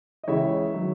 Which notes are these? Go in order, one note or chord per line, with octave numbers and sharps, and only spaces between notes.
D#5
C#2 C#3 E3 C#5 E5
D#3 F#3